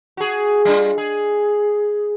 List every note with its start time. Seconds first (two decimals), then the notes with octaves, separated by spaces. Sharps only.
0.17 F#4 G#4
0.65 G3 D4 F4
0.98 G#4